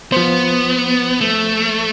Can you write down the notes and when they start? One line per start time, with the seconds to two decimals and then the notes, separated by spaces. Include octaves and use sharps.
0.12 F3 B3 C5
1.21 A3